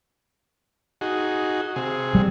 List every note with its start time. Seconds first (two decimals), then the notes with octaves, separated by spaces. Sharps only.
1.01 D#4 F#4 G#4
1.76 C3 G#4
2.15 G3